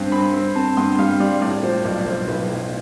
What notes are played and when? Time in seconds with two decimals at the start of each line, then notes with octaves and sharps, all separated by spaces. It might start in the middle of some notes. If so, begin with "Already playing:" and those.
Already playing: G2 C4
0.12 C4 B5
0.34 C4
0.55 C4 A5
0.77 G2 C6
0.99 G3 F5
1.20 G3 D5
1.41 A2 D5
1.63 F3 C5
1.84 B1 D5
2.06 B1 C5
2.28 B1 B4
2.49 A2